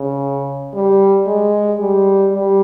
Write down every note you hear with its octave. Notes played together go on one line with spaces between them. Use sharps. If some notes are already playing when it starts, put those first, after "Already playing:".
Already playing: C#3
G3
G#3
G3
G3